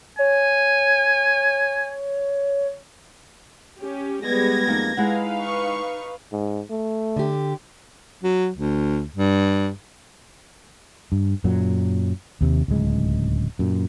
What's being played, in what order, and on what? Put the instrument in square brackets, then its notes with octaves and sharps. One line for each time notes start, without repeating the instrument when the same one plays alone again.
[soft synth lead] C#5 [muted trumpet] G#5
[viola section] C#4 G4
[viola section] G3 G#3 B3 [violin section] G#6 A#6
[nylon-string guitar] F2 A#3 D#4
[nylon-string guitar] G#3 E4 F#5 [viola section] D#4 B4 F5
[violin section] C#6
[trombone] G#2
A3
[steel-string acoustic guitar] D3 G4
[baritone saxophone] F#3
D2
G2
[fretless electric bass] G2
F#2 A#2 F#3
D#2 C3
D1 C#2 G#3
F#2 A#2